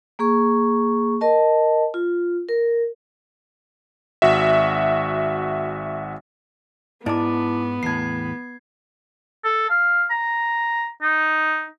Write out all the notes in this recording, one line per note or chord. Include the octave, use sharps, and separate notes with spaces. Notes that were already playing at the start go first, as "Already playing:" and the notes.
A#3 G#4 C#6
A#4 D#5 A5
F4
A#4
G#1 F#4 E5
G#2 B3 D4 E4 A5 D6
E2 A2 G#6 C7
A4
F5
A#5
D#4